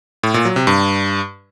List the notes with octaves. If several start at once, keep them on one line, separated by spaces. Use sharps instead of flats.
A2
A#2
F#3
C3
G2